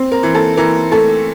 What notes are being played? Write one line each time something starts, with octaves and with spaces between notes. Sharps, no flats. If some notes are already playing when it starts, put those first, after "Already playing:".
Already playing: C4
A#4
E3
A4
E3 A#4
A3 A4